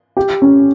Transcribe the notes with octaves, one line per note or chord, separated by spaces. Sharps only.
G4
C#4